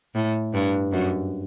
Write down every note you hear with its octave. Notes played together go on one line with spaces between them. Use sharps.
A2
G2
F#2